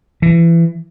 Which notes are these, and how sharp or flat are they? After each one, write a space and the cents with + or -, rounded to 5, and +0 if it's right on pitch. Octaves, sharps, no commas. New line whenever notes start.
E3 +25